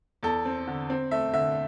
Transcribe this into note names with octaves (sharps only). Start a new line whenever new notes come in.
E2 A4
C4
D3
C4
A3 E5
D3 E5